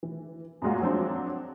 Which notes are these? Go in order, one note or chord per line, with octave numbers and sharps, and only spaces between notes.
E3
F#2 A#2 G#3 F4 F#4
F3 F#3 C4 D4